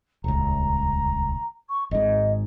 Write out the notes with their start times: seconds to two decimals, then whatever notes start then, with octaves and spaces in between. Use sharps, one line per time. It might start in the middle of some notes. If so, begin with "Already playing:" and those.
0.24 D#1 C#2 A#5
1.69 C#6
1.91 G#1 G#2 D#5